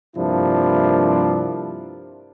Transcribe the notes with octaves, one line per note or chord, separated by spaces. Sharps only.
G2 C3 F3 A#3 D4 E4